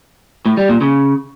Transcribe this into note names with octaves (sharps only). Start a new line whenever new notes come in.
A2
G3
A#2
C#3